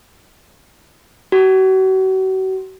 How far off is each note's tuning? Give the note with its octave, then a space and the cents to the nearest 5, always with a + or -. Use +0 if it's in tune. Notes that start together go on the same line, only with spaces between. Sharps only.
F#4 +40